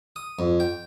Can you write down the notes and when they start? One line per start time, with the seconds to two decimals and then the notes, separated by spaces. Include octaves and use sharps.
0.16 D#6
0.39 F2
0.60 G5